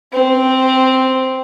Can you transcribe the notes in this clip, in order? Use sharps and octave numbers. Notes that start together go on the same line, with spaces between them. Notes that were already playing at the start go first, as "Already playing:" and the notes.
C4